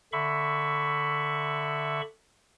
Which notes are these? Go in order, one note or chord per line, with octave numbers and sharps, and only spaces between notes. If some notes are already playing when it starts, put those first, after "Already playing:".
D3 E5 B5 C#6